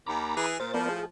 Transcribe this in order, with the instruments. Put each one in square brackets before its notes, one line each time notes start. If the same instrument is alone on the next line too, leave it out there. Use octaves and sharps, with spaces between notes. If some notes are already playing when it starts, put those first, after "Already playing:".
[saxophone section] D#2 [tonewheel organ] A#5 B5 D6
[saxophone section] E3 G#4
[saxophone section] A#2 [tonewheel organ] C5 A6
[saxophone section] A2 F3 [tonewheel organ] B3 A#4 D5
[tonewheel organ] G#4